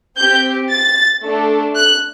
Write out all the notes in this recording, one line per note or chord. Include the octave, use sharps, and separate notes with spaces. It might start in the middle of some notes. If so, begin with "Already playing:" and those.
C4 G4 G6
A6
A3 D4 A4
F#6